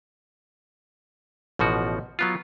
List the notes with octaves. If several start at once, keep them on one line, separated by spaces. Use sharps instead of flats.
A1 B2 F3 F#4
F#3 B3 F4